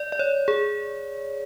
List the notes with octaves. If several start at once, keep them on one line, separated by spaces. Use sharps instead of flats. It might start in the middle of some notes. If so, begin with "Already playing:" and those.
Already playing: D5
D5
C#5
G#4